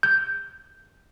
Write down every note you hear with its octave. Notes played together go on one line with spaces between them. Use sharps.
G6